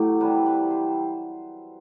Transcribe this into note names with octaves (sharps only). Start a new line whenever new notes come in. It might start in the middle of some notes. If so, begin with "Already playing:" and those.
Already playing: A2 F#3 A3 G4
C3 E3 G3 B4
B4
C5